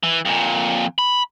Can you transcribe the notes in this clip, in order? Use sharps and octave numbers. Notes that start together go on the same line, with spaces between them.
E3
F2 A#2
B5